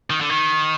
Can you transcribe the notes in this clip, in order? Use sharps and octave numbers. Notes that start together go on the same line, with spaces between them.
D#3
D3
D#3